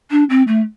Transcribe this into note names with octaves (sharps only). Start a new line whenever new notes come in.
D4
C4
A3